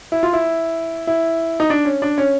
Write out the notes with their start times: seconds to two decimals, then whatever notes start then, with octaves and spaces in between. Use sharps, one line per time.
0.12 E4
0.23 F4
0.33 E4
1.07 E4
1.60 D#4
1.70 D4
1.85 C#4
2.02 D4
2.18 C#4